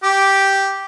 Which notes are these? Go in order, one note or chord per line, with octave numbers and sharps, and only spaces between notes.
G4 D6